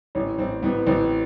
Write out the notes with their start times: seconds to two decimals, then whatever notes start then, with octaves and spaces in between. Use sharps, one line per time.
0.15 A1 C#4
0.38 A1 C4
0.63 A1 B3
0.87 A1 C4